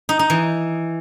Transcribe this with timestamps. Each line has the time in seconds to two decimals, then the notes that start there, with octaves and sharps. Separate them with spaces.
0.09 D#4
0.19 D#4
0.30 E3